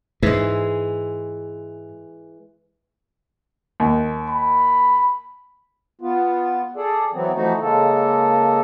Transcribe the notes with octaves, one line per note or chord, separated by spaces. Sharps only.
G#2 E3 G#3
D#2
B5
B3 F4
G#4 A4 D5
E3 F#3 B3 C4
E3 F3 A3 D#4 F#4
C#3 G#3 A#3 A4